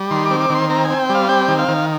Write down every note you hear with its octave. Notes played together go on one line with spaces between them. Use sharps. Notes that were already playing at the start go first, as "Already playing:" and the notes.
Already playing: G3
D#3 C6
D6
C4
D6
D#3
C6
C4 A#5
G#5
C4
G5
G3
F5
C4 G5
D#3
F5
D#3